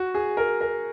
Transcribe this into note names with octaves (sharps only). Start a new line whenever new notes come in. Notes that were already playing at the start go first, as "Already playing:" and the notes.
Already playing: F#4
G#4
A#4
A#4